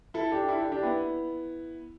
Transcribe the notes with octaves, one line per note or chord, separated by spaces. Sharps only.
E4 A4
D4 G4
E4 A4
D4 G4
D4 G4
B3 E4